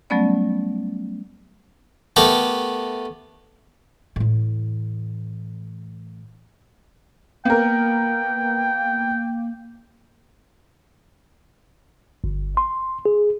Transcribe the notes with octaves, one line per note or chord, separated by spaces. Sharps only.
F#3 G3 A3 B3 C#4 D5
A3 B3 G4 A4 A#4
A2 E3
A#3 B3 A#4 G5
G1
C6
G#4